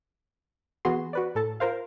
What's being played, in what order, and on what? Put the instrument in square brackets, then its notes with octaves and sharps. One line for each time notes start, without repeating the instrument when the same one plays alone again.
[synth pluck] E3 B3 F#4 G#4 F#5 C6
F#4 B4 D5
A2 A4 A5
F4 A#4 C5 F5